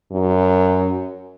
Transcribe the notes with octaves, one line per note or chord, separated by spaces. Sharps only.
F#2